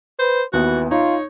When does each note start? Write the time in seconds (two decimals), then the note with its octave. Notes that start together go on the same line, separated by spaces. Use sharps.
0.19 B4 C5
0.53 D#2 E3 B3 F#4
0.91 D#4 F4 C#5